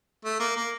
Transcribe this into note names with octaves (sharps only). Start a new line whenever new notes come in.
A3
A#3
A#3